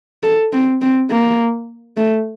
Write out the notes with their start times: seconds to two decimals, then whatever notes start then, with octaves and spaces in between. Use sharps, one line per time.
0.23 A4
0.53 C4
0.81 C4
1.11 A#3
1.97 A3